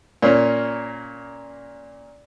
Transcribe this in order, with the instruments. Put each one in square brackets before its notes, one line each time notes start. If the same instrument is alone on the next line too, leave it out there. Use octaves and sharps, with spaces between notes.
[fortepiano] A#2 A#3 C#4